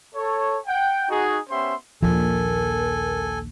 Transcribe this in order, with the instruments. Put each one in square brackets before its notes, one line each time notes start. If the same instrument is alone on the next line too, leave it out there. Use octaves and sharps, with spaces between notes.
[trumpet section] A4 C#5
F#5 G5
D#4 F#4 G#4
B3 C#4 G4 C5 E5 C6
[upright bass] A#1 D#2 [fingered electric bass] F3 [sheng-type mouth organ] A4 G#5 [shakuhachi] A#4